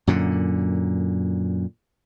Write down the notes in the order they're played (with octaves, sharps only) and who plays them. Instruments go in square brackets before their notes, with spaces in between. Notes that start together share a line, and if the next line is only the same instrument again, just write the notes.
[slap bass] F#2 A#2 D3